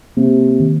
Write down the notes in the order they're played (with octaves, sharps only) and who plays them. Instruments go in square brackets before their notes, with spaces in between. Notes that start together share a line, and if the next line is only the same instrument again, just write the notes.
[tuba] C3 [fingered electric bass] A#3
[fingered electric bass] D#3